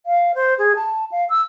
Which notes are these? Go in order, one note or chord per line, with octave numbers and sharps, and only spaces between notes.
F5
C5
G#4
A5
F5
E6